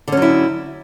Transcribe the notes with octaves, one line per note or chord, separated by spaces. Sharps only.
D3 F#3 C#4 E4